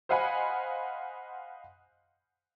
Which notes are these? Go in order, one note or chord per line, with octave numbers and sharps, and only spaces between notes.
C5 D#5 F5 F#5 G#5 B5